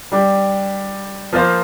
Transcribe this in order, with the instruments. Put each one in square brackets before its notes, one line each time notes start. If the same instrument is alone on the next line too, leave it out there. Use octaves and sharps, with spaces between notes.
[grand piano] G3 D4 G4
F3 A#3 F4 C5